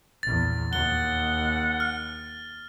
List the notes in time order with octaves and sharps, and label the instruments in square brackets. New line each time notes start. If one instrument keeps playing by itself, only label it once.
[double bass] A#1 E2 [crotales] A6
[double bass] D#2 [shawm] F#5 [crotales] G7
[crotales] F6